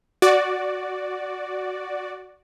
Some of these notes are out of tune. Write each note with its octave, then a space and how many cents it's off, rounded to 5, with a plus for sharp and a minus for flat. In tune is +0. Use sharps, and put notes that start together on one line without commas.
F#4 +0 D5 +0